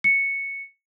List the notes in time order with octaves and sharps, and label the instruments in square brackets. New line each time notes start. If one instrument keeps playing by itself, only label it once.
[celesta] C#7